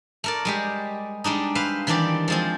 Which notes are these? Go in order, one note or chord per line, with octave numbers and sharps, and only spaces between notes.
A3 A#4 D5
G3 G#3 G4
G3 G#3 D4 D#4
B4 C5 E5 F5
D#3 E3 C4 D4 G4 D5
F3 G#3 C4